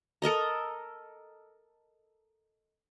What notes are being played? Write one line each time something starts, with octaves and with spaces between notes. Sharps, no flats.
A4 A#4 D#5 A#5